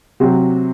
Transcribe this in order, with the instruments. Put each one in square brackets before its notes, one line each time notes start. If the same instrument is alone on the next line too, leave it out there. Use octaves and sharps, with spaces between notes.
[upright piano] C3 F#3 C4 F#4